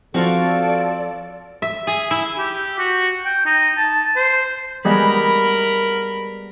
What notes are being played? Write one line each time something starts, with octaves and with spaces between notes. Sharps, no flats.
F3 C4 F4 F#4 A4 D5 F5 C#6
E5
G#4
E4
G4
F#4
G5
D#4
A5
C5
G3 G#3 B3 A#4 B5